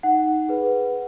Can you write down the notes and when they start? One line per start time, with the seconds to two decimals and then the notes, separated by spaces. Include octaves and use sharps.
0.03 D#4 F#5
0.49 G#4 B4